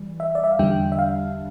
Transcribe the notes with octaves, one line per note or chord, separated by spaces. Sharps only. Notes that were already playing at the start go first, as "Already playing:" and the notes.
Already playing: E3 G3
E5
D5
E5
F5
E2 D3 G3 D4 G5
E5
F5